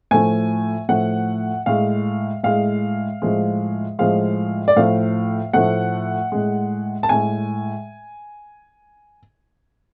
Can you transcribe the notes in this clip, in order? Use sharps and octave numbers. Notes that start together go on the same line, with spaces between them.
A2 F3 A3 G#5
A2 F3 A3 F#5
A2 G#3 F5
A2 G#3 F5
A2 F3 G#3
A2 F3 G#3 F5
D5
A2 F3 A3 F5
A2 F3 A3 F#5
A2 G#3
A5
A2 G#3 G#5